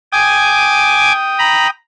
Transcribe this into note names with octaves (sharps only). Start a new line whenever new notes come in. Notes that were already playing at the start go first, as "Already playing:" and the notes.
G5 G#5 D6 D#6
A#5 B5